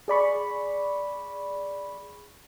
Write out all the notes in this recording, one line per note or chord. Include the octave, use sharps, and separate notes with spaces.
G#4 D5 B5 C#6